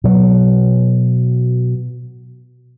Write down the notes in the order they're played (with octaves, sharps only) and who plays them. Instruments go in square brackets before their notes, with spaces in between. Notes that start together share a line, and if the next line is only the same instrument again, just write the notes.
[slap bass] B2 F#3